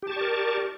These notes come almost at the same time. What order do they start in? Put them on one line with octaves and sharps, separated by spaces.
G4 A5 C#6 D5 A#4